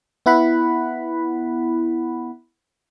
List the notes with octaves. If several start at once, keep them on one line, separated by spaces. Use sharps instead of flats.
B3 E4 F#5 B5